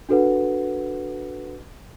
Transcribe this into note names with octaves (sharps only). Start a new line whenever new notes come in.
D4 F#4 A4 B4 F#5